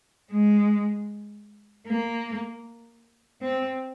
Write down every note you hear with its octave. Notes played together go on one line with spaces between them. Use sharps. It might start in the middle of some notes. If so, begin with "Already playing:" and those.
G#3
A#3
C4